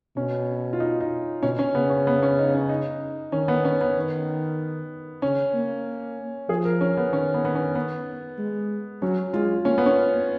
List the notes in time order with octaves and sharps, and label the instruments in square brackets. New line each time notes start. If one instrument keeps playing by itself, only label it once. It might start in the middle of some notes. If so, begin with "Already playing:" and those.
[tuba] B2 [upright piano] C#4
[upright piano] F4
D#4
D#4
[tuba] B2 [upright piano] C#4
[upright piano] C#4
[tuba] C#3 [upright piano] B3
[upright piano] C#4
B3
C#4
D#4
C#4
D#4
[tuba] D#3 [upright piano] C#4
[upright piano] B3
C#4
B3
[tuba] D#3
[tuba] C#3 [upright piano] C#4
[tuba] A#3
[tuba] F3 [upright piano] G#4
[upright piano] A#4
C#4
B3
[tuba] D#3 [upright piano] C#4
[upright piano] B3
B3
C#4
B3
[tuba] G#3
[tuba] F#3 [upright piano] C#4
[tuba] G#3 [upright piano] F4
[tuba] A#3 [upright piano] C#4
[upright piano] B3
C#4